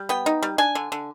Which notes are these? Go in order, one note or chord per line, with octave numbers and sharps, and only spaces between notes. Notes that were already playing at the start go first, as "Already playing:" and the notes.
Already playing: G3
B3 G5
D#4
G3
D4 G#5
D3
D3